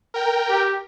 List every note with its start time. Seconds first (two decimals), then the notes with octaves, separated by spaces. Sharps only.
0.14 A#4 G5
0.49 G4